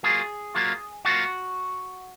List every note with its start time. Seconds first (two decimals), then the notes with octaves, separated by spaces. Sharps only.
0.03 F#3 A#3 F4 G#4
0.55 F#3 A#3 F4
1.05 F#3 A#3 F4 F#4